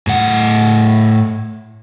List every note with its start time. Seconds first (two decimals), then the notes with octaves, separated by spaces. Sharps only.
0.07 A2 F#5